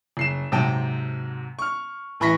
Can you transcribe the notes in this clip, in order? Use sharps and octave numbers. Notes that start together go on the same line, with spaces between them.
F#1 C7 E7
G#2 C3 F#3 G5 A5
C#6 F6
A1 E3 B5 C#6 A#6 B6